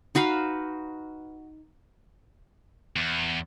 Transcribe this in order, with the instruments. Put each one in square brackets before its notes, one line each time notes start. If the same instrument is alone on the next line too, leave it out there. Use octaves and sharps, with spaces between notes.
[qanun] D#4 F#4 B4 F5
[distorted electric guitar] E2